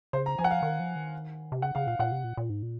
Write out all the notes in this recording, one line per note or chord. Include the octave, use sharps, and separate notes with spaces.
C#3 C5
A#5
F3 G#5
F#5
F5
D#3
F3
D#3
C3
C#3 F#5
C#3 F5
A#2 F5
A#2 F#5
C3
A#2
A#2
G#2
A#2